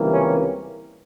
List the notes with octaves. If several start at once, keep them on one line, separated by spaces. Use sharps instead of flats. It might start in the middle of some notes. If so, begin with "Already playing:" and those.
Already playing: C#2 C3 E3 G3 A#3
C#4